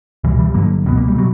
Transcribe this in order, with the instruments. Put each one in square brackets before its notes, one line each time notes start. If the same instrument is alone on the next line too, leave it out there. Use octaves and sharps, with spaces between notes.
[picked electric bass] C#2 B2 E3 G3
E3 G3
G1 G2 D3 F#3 A#3
C#2 B2 B3
A#3
G3
B2 F#3